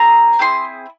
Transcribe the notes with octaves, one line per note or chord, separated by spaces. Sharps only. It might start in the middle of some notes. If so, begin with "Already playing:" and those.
Already playing: C4 G#4 A#5
C4 E4 G#4 C6